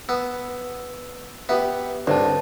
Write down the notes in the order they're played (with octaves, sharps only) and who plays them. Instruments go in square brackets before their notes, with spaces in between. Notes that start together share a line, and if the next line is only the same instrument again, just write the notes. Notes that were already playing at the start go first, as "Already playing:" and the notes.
[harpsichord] B3 [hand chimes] E6
[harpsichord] B3 [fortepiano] G4 B4 E5
[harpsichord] C2 [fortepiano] G2 D3 [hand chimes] B4 C#5 A5